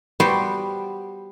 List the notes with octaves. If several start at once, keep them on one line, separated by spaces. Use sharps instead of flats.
G3 B3 F#4 C5 G5